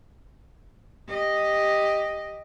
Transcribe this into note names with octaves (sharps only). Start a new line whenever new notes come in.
G4 D#5